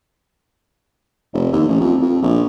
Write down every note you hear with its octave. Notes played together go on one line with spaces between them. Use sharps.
F1
D#2
A1
F2
F2
A#1